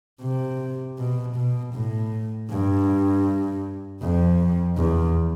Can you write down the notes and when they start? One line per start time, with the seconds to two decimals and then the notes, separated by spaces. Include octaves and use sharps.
0.22 C3
0.99 B2
1.36 B2
1.74 A2
2.50 G2
4.02 F2
4.77 E2